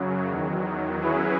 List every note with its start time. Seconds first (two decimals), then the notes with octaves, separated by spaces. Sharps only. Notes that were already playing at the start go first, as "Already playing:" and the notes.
Already playing: F#2 C#3 F#3
0.30 E2 D#3 F#3
1.01 F#3 C#4 E4 G#4 B4